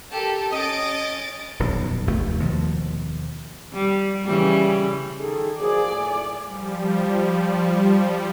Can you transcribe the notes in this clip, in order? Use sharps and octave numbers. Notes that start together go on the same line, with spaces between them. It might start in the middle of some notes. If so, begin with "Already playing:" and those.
G4 A4 A#4
C#4 D#5 A6 D7
D#1 B1 F2
F1 D#2 A3
D#2 B2 F3
G3
C#3 E3 G3
D#3 G#4 A4
F3 F#3 A#3 G#4 D5
A2 G#5
F3 G3